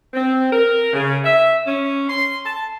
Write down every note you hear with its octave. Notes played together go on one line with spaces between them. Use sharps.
C4
A#4
C#3
E5
C#4
C6
A5